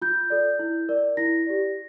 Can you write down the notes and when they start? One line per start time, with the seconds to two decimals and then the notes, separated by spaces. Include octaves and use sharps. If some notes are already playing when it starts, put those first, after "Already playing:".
0.02 F4 G6
0.30 A4 D5
0.59 E4
0.89 A#4 D5
1.17 E4 A#6
1.46 G4 D5